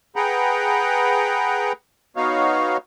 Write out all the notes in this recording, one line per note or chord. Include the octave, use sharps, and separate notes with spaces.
G#4 B4 F#5 G5 A#5
B3 D#4 F#4 C#5 F5